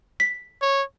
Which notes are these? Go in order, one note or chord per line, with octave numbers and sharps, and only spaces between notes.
B6
C#5